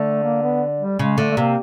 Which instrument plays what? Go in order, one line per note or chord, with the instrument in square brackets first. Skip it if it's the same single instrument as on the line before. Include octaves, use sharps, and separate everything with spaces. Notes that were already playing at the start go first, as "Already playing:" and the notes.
Already playing: [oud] D3 [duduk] A3
[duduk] A#3
B3
G3
[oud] C#3 [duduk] G#3
[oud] D3 [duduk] A3
[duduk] A3
[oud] C3 [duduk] A#3